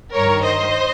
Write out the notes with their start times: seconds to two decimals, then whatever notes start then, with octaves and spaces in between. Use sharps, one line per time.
0.14 G2 D#3 A#4 C#5
0.44 C5 D#5